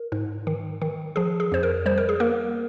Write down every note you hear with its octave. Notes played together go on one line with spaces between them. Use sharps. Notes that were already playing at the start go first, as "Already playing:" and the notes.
Already playing: A#4
G#2
D#3
D#3
F3 G#4
G#4
F2 C5
A#4
G3 C5
A#4
G#4
A#3 A#4